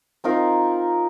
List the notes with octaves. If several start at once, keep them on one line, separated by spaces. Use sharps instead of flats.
C4 D#4 F4 A#4